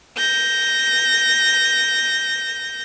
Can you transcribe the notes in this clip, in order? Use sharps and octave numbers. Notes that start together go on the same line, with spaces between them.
G6 A#6